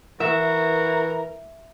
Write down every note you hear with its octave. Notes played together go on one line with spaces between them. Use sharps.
E3 F#4 A#4 E5